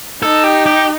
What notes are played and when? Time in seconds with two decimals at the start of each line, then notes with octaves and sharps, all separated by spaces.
0.22 D#4 A4
0.44 G4
0.66 G4